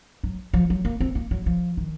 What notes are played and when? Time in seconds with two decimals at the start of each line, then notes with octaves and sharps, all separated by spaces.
0.23 F#3
0.53 F3
0.70 F#3
0.85 A#3
1.00 C4
1.15 A#3
1.31 F#3
1.46 F3
1.77 D#3